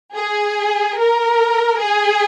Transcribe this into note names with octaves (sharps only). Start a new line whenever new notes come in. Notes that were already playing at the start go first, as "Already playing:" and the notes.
G#4
A#4
G#4